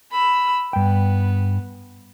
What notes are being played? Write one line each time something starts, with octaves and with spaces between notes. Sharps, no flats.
B5 E6
G2 B3 G5